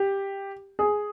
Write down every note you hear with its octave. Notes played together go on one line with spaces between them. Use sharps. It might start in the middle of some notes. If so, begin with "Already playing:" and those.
Already playing: G4
G#4